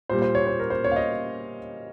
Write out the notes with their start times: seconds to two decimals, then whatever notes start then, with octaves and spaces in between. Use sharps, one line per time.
0.10 A#2 G3 C5
0.22 C5
0.35 C#5
0.47 C5
0.60 A#4
0.70 C5
0.84 C#5
0.91 F5
0.96 D#5